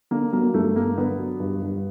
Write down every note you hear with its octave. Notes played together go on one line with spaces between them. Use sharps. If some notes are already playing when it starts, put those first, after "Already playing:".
D3 A#3
F#3 A#3
G2 A3
G2 A#3
D3 B3
F#3
G2
G2